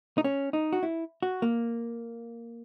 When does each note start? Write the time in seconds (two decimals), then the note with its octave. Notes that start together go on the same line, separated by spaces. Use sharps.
0.18 D#4
0.24 C#4
0.53 D#4
0.73 F#4
0.83 E4
1.23 F#4
1.42 A#3